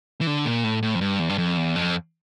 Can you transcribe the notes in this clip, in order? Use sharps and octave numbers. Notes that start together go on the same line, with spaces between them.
E3
D3
A#2
A2
A2
F2
G2
E2
G2
F2
E2
F2